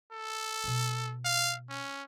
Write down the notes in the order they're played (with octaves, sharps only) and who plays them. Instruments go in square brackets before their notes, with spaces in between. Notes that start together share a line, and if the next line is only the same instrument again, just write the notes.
[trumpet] A4
[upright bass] B2 C4
[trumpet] F5
C#4